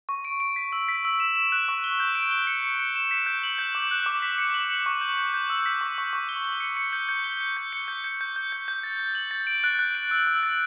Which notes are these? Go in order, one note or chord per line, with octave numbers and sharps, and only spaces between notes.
C#6
D7
D7
B6
E6
B6
E6
E7
E7
F#6
C#6
G7
G6
D7
G7
C#7
C#7
C#7
E7
B6
G6
F#7
G6
D6
F#6
D6
B6
C#7
F#7
F#7
C#6
G6
G6
G6
E6
B6
C#6
C#6
C#6
G7
G7
C#7
C#7
G6
G6
G7
C#7
G6
C#7
G6
G6
G6
G6
G6
G6
A6
A6
F#7
A6
D7
F#6
F#6
D7
E6
E6
A6